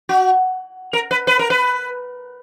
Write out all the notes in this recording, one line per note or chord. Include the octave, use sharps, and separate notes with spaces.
F#4
A#4
B4
B4
A#4
B4